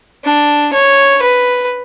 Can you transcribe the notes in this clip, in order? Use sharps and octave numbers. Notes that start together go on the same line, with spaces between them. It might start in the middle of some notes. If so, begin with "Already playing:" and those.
D4
C#5
B4